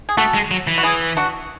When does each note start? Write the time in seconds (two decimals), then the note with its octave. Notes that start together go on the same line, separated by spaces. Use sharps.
0.09 G#4
0.17 A3 F#4 A4
0.34 G#3
0.51 F#3
0.67 E3
0.78 F#4
0.83 E4 G#4
1.17 D4 F#4